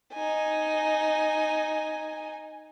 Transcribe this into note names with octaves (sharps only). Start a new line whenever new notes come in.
D#4 G#5